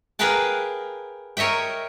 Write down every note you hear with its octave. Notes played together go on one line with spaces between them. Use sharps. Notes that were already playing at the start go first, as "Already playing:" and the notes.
G#4 A#4 B4 F5 G5 A5
A#4 C#5 D#5 E5 G5